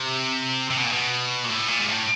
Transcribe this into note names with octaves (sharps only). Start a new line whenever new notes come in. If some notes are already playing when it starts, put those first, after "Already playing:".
Already playing: C3
C3
B2
A#2
B2
A#2
A2
A#2
G#2
A2